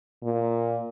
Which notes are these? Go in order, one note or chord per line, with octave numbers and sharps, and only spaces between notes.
A#2